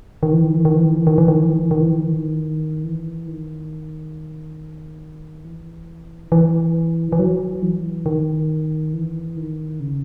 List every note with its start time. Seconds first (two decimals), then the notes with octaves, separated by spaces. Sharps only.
0.23 D#3
0.33 E3
0.44 D#3
0.54 E3
0.65 D#3
0.75 E3
0.86 D#3
0.97 E3
1.07 D#3
1.18 E3
1.28 D#3
1.39 E3
1.49 D#3
1.60 E3
1.71 D#3
1.82 E3
1.92 D#3
2.02 E3
2.12 D#3
2.84 E3
3.27 D#3
5.45 E3
6.32 E3
7.12 E3
7.19 F#3
7.62 E3
8.06 D#3
8.93 E3
9.37 D#3
9.80 C#3